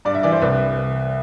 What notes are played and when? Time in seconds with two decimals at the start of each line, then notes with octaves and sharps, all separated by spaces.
0.05 G2 D5
0.15 E5
0.23 E3 D5
0.32 C5
0.42 C2 B4
0.53 B4